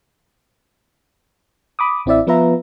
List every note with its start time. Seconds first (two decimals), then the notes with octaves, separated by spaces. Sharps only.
1.79 B5 D6 D#6
2.06 A1 C4 E4 D5 E5
2.27 F3 B3 F4 B4 E5 A#5